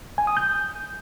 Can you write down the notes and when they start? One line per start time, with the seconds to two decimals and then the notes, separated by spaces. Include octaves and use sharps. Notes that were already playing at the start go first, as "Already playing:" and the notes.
0.18 G#5
0.27 D#6
0.37 G6